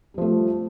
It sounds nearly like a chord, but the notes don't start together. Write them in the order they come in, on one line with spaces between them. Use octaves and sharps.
G3 F3 A3